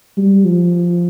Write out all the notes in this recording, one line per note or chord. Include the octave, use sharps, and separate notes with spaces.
G3
F3